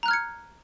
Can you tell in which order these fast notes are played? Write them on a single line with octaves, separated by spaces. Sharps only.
A#5 F#6 F6 G#6 C#7